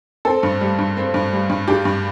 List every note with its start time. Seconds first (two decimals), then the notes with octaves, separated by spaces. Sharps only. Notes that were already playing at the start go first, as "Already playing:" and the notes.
0.25 C4 A4
0.43 G2
0.61 G3
0.79 G2
0.97 C4
1.14 G2
1.33 G3
1.49 G2
1.68 D4 G4
1.85 G2